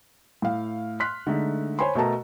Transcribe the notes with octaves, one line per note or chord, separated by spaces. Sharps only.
A2 F5
C6 F6 F#6 B6
D3 G#3 A3 D#4
C5 C#5 G#5 B5 C6
B2 A3 F#4 A#4 A5 A#5